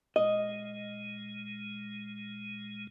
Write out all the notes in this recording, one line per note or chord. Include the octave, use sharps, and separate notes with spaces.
A#2 G#3 D#5